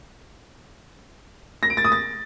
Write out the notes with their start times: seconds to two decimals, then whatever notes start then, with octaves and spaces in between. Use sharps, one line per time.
1.63 A#6
1.70 D7
1.77 A6
1.85 D#6
1.92 A6